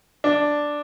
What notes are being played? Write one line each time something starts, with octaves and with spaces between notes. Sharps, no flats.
D4